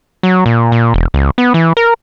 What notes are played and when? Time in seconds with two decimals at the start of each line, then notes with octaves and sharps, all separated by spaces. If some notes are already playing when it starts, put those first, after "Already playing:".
0.23 F#3
0.46 A#2
0.72 A#2
0.94 E1
1.14 C#2
1.38 B3
1.54 E3
1.77 A#4